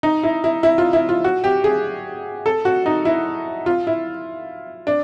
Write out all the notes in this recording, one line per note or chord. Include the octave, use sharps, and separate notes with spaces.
D#4
E4
E4
E4
F4
E4
F4
F#4
G4
G#4
A4
F#4
D#4
E4
F4
E4
D4